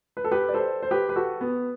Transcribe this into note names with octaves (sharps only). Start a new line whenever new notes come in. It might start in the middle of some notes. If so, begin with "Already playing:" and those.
B4
A4
G4 B4
D5
A4 C5
C5
G4 B4
B4
F#4 A4
B3